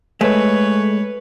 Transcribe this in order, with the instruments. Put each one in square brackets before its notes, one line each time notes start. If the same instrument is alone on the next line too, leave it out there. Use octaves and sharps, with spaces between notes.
[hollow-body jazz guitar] G#3 A3 [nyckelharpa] B4 C#5